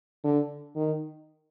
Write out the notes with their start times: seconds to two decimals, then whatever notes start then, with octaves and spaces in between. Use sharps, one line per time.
0.24 D3
0.76 D#3